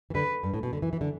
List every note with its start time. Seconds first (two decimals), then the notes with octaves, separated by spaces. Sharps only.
0.10 E3
0.15 D3 B4
0.43 G2
0.54 A2
0.63 B2
0.73 D3
0.82 E3
0.93 E3
1.01 D3